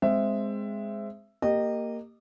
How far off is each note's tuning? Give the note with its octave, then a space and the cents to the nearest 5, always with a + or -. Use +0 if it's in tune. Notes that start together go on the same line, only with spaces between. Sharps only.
G#3 +0 C4 +0 E5 +15
A#3 -10 G4 +0 D#5 -20